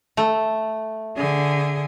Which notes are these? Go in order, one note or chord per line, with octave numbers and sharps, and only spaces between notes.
A3
D3 G#4